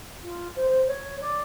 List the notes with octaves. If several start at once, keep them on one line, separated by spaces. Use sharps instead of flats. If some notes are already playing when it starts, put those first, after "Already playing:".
F4
C5
C5
C#5
D5